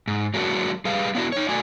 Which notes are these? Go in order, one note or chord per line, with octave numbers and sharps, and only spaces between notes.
G#2
F#3 G#3 A#3 D4 F#4
G3 G#4 B4 F5
B3 D4 E4 F#4
D#4 C#5
A3 F#4 D5 G#5